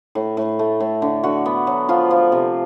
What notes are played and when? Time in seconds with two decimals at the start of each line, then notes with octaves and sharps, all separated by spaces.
0.15 A2
0.37 A2
0.59 A3
0.80 A2
1.02 D3
1.24 D3 F#4
1.46 B3
1.67 F#3
1.89 F3 F4
2.11 F3
2.32 C3